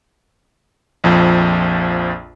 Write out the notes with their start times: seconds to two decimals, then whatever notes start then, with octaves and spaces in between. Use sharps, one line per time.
1.04 A#1 F2 F3